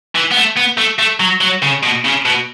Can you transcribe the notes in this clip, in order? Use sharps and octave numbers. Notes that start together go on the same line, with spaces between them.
E3
B3
A3
B3
A3
A3
F#3
F#3
C#3
B2
C#3
B2